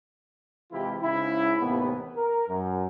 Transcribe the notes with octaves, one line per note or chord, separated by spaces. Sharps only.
C3 E3 G#3 E4 F4 G4
G#2 C#3 C#4 E4
D#2 A2 C3 E3 B3
A#4
F#2